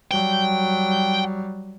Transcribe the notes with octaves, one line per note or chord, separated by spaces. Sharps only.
F#3 G3 G5